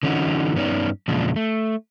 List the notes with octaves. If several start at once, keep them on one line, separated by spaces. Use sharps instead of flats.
D3 E3 C#4 D#4 F#4
G2 B3 C#4 D#4 D5
E2 A#2 C#3 F3 G#3 D4
A3